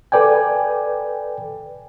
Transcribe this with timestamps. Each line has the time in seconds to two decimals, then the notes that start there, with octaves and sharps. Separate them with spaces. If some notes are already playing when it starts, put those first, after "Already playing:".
0.12 A4 B4 D5 G5 G#5